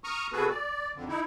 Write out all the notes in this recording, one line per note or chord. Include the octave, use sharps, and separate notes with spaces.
A#5 C#6 D#6 F6
C3 B3 F#4 G#4 A4 B4
D5
F2 D3
D#4 E4